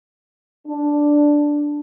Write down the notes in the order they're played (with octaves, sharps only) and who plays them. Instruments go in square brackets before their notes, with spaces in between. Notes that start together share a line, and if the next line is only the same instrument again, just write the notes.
[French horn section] D4